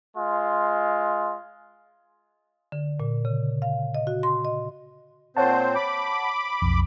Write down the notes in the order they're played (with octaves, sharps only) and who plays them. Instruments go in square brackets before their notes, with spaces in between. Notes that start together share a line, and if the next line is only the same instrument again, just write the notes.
[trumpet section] G#3 F4
[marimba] D3
A#2
C#3
F5
D#5
F#4
C6
D#5
[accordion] A#2 C4 C5 [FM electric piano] C#5 F#5 A5
[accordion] B5 D6
[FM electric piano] B1 F2